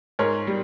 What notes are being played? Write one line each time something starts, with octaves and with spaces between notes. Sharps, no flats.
G#2 A#4 C#5
G3